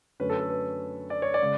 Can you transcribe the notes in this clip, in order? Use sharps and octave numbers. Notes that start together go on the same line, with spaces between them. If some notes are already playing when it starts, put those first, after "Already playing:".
F#2 D3 A3 C#4 B4
A4
A4
B4
D5
C#5
D5
C#3 G#3